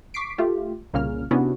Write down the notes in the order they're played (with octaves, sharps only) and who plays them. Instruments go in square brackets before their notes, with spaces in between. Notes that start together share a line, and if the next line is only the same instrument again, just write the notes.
[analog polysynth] C#6 D6 B6 C7 D7
A3 F4 G4
C2 A#2 C#3 A#3 C#4 F6
C3 B3 C#4 D4 E4 F#4